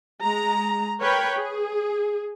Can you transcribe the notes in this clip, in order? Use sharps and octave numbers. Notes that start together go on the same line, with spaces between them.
G#3 A#5
A#4 B4 C#5 G5 B5
G#4